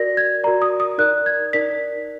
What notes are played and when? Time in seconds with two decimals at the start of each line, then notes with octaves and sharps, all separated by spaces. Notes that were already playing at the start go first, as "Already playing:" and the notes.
Already playing: F#4 A#4 D5 A#6
0.17 G#6
0.44 F#4 A#4 D5 A#5
0.62 D#6
0.80 D#6
0.98 D#4 A#4 D5 F#6
1.26 G#6
1.53 D#4 A#4 D5 B6